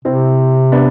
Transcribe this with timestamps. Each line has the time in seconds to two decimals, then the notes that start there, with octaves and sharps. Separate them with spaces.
0.05 C3 C4 E4
0.72 B3 D4